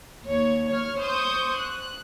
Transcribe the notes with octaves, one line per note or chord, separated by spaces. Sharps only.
D#2 C#5
C#5 F6
C5 C#6 D#6 G6
F#6